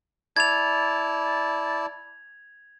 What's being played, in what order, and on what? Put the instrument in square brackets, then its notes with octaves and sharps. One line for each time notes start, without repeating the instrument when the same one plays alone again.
[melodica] E4 D5 A5 [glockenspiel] G#6 F7